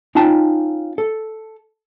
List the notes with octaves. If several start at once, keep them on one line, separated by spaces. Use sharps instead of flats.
C#4 D#4 F4 G5 A5
A4